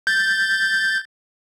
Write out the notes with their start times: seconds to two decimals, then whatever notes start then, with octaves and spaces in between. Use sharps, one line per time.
0.07 G6 A6